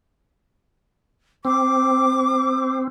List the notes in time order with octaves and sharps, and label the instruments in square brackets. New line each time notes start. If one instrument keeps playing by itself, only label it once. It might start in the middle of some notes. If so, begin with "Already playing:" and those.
[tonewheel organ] C4 [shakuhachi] D6